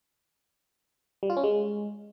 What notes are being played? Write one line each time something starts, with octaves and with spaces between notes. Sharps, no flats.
G3
F4
C#4
G#3